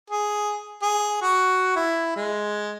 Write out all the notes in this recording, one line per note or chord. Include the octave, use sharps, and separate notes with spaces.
G#4
G#4
F#4
E4
G#3